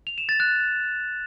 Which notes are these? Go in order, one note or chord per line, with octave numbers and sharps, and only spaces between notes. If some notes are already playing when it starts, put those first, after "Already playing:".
F7
E7
A6
F#6